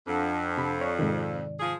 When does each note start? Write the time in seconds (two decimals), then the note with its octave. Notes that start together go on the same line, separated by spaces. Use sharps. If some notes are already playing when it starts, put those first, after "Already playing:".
0.07 F2 D4 F#5 A5
0.58 C3 B5
0.81 C#5 D5 C#6
0.99 G#2 C3 D#3
1.60 F3 G#4